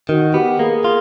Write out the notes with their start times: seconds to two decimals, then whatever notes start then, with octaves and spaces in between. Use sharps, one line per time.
0.09 D#3 F#4
0.34 B3 G4
0.59 A#3 G#4
0.84 F4